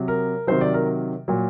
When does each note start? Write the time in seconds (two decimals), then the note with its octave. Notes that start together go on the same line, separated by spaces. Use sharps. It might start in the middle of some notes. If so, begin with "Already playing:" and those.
Already playing: C3 F#3
0.08 A#4
0.47 C3 D#3 F#3 C5
0.61 D5
0.74 A#4
1.28 A#2 F#3